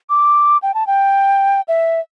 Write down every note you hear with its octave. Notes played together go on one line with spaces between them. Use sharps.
D6
G5
A5
G5
E5